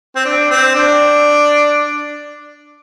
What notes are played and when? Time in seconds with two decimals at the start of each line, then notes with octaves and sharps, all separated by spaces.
0.16 C4
0.25 D4
0.50 C4
0.75 D4